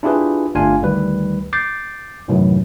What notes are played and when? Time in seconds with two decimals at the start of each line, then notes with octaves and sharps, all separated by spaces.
0.03 D4 E4 F4 G4 G#4 B4
0.55 G1 A3 D4 F4 F5 G#5
0.82 D2 D#3 G3 B4
1.53 D6 G6 A6 C7
2.28 F#2 A2 C3 D#3 E3 F#3